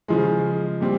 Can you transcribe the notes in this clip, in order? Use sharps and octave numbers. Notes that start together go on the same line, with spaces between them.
C#3 F3 G#3
A#2 G3 C4